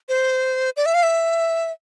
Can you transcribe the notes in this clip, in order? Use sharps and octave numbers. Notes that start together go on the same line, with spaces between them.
C5
D5
E5
F5
E5